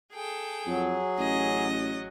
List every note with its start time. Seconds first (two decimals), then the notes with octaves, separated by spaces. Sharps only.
0.14 G#4 A4 G5
0.66 F2 F#3
1.18 A1 C#4 D#5
1.68 F#3